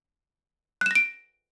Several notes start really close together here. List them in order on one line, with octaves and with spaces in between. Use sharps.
F#6 E7 A#6 D7